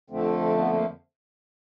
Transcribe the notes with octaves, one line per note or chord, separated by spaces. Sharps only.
F2 D3 F3 A3 C4
B3
A#3